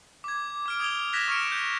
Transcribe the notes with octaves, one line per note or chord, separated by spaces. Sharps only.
D6 G#6
D6 F6 D7
D#6 G#6 F7 G7
D#6 F#6 G#6 A#6 B6 E7
C#6 F6 G#6 C#7 D7 E7
G6